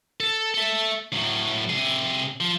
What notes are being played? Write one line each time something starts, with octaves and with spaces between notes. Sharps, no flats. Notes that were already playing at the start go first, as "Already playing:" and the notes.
A4
A4 E5
A2 F#3
C3 G#4
F3